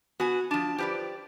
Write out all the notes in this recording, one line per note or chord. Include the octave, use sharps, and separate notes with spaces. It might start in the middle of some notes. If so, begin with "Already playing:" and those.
B3 F#4 G#5
F3 D4 A5
F3 G4 B4 D5